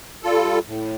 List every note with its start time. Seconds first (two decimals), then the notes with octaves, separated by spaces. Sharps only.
0.23 G3 F4 A4
0.68 A2